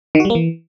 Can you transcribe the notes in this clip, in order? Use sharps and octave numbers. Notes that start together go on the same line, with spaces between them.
D#3
F#4
G3
A#3
E3